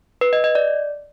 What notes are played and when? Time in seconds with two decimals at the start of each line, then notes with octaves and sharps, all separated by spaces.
0.21 B4
0.33 D#5
0.44 D#5
0.55 D5